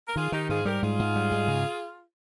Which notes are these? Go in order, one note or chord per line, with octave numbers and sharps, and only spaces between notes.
A#4
D#3 F4 G#4
D#3 D#4 G4
G#2 F4 G#4
G3 G4 A#4
G#2 F4 G#4
G#2
G3
G#2
C#3